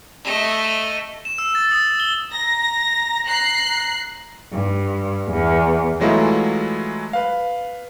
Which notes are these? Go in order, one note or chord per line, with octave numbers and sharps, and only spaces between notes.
A3 D#5
E7
E6
A6
D#6
G7
A#5 A#6
F#6 C7
G2
E2
E3 F#3 G#3 A3 E4 F4
B4 F5